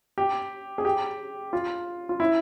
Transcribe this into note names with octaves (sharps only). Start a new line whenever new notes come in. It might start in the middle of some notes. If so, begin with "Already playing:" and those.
G4
G#4
G4
F4
F4
E4